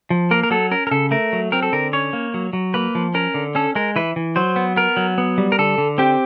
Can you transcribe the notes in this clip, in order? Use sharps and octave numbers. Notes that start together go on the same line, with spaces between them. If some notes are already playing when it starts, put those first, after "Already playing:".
F3
A#3 A#4
A#4
F#3 A4
C#4 A#4
A#4
C#3 A4
A3 A#4
F#3
C4 A#4
A4
D3 A#4
C#4 C#5
A#3
F#3
F#3
A#3 B4
F3
C#4 A#4
D3
C#4 A4
G#3 A#4
E3 B4
E3
F#3 C5
B3
B3 A#4
F#3
B3
G3
A#4
D3 A4
D3
C4 G4